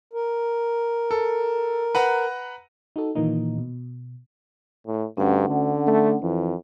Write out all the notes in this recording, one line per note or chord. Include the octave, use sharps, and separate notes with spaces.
A#4
A4
B4 F#5 A#5
D#4 F#4 A4
A#2 D#3 E3 A#3 D#4
B2
A2
D2 G2 C#4 F#5
D3
A3
F2 E3